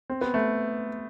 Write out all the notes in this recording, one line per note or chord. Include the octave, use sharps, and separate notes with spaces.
C4
B3
A3